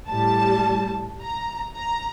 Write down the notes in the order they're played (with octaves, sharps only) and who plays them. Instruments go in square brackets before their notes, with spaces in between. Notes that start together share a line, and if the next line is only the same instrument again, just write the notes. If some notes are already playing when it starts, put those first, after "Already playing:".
[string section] A2 G3 A5
A#5
A#5